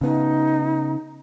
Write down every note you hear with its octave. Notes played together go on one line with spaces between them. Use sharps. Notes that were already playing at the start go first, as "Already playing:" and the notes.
C#3 B3 D#4